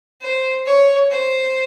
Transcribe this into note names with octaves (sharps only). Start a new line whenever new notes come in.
C5
C#5
C5